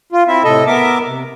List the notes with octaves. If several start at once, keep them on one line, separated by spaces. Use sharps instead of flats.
F4
C4 E4 E5
A2 C3 A4 D#5
B3 A#4 E5 D6
C3